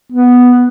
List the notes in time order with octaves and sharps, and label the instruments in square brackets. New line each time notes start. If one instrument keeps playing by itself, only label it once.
[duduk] B3